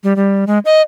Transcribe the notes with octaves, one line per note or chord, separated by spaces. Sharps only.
G3
G3
G#3
D#5